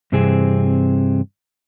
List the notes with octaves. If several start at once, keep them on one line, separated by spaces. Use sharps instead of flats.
G2 C3 E3 C4 G#4